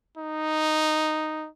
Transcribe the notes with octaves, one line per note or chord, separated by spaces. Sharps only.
D#4